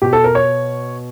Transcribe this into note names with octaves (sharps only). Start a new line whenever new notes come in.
B2 G4
A4
A#4
C#5